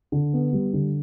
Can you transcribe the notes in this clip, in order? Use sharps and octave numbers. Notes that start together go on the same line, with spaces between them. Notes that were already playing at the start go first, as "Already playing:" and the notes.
D3
B3
G3
D3